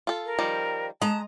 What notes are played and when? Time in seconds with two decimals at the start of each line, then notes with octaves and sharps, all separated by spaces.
0.07 F4 A4
0.26 A#4
0.39 D#3 F3 G3
1.01 G#3 D#5 A5 A#5